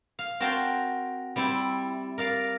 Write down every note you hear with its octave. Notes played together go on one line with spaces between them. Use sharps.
F5
C4 F#4 A#4 G5 A5 C6
G3 C4 E4
A#4 D5 F5